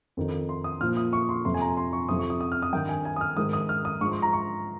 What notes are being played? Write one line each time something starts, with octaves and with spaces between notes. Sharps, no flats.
F2 D#3
C6
D#6
A#2 F3 F6
D#6
C#6
C6
F2 C3 F3 C6
G#5
A#5
C6
C#6
F2 C3 F3 D#6
C#6
D#6
D#6
F6
D#6
G2 D#3 G5
G#5
G#5
D#6
F6
G#2 D#3 D#6
D#6
F6
D#6
G#2 F3 C#6
C6
A#5
C#6